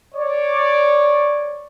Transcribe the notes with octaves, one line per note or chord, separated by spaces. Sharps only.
C#5 D5